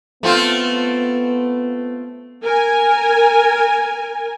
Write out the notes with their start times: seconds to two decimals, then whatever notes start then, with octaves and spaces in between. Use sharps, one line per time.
0.23 A3 B3 C4 F4
2.44 A#4 G#5